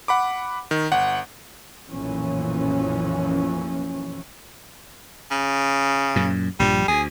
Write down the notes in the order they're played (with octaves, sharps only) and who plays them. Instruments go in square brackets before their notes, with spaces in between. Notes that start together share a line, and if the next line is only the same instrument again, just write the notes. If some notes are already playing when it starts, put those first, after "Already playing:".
[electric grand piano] F#5 B5 D6
D#3
G1 F#5
[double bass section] B1 F#2 A#2 E3 F3 C#4
[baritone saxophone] C#3
[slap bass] F#2 A#2
[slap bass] A#1 G2 F3 [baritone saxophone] G3
[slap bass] D2 [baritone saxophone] G#4